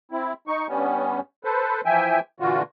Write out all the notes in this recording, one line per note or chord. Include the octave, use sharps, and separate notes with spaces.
C4 E4
D#4 C#6
G2 G3 B3 C#4
A4 B4 C5
E3 F3 E5 G5 G#5
A#2 D3 E3 F4 F#4